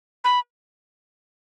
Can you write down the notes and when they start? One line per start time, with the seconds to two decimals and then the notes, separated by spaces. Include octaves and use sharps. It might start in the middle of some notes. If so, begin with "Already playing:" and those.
0.24 B5